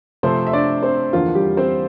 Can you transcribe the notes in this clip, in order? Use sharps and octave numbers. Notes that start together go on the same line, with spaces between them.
C3 F3 A3 C4 C5
E5
D4 D5
C4 C5
E2 D3 F3 A#3 F4
G3 G4
C4 C5